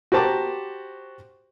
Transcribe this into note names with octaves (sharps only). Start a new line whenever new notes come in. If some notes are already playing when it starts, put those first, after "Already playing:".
F#4 G4 C5 A5 A#5 D6